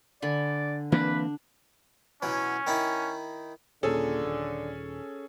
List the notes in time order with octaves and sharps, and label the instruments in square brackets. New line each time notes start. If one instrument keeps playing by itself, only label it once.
[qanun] D3 G#5 B5 [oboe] D5
[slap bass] E3 A#3 C4 [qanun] D4 [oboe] B4
[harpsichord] B2 E3 F#3 [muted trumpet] C#4
[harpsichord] D#3 D#4 E4
[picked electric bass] D#1 A#2 [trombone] D3 [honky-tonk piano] C#4 G#4 A4
[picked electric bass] D#1